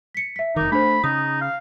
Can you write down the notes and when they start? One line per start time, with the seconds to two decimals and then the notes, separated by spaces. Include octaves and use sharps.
0.15 B6 C#7
0.36 E5 B6
0.56 F1 D#3 D#4 A#4 D6
0.72 A3 D4 C5 B5
1.04 C#3 D#4 D#6
1.41 F5